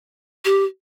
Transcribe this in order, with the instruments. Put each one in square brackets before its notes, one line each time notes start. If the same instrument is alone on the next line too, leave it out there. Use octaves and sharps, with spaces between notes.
[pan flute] G4